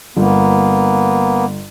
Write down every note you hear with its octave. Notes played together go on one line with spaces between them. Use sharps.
G1 A#3 B3